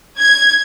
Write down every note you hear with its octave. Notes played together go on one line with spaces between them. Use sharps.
G#6